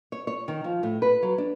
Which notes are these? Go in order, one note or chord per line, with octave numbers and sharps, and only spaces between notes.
C#5
C#5
D#3
F3
A2
B4
F#3
D4